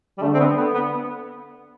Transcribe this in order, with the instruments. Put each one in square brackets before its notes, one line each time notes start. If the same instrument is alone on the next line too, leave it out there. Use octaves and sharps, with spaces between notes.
[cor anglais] G3
[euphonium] D3 [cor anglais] A3
[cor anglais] C4
B3
B3
B3